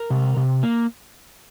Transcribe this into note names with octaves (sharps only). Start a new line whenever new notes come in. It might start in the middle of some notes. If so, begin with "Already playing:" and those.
Already playing: A#4
C3
C3
A#3